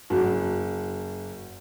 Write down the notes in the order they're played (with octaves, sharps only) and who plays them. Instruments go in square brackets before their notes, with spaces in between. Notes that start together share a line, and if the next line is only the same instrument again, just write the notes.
[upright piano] F#1 [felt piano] F#4